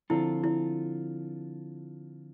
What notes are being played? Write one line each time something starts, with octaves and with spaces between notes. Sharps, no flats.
D3 F3 C4 E4 F4 A4
E4